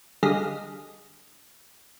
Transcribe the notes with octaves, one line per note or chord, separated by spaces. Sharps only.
D3 G3 G#4 D#5 F5 A#6